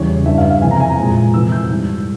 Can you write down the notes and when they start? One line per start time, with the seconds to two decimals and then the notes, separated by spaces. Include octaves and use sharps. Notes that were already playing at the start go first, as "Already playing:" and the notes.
Already playing: E2 C#3 E3 G3 C#5
0.26 G2 G3 E5
0.38 F5
0.51 F5
0.62 F2 C3 E3 G#5
0.71 A#5
0.80 G#5
0.89 A#5
0.99 A#2 G#3
1.34 F2 C3 E3 E6
1.52 G6
1.70 G#2 E3 G3